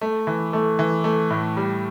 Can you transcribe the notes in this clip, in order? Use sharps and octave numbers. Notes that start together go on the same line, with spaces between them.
A3
E3
A3
E3
A3
A2
G3